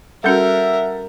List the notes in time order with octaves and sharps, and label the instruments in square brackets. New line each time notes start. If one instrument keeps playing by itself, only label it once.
[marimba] G3 C#4 F#4 [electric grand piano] A4 F#5 G6 [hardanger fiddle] A#4 [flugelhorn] E5